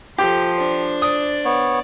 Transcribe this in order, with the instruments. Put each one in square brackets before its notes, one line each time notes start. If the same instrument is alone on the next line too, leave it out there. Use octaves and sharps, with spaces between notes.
[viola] F3 [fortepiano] G4 [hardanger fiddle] A4 C6
[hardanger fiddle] D4 C5
[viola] D5 [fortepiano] D#6
[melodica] B3 C#5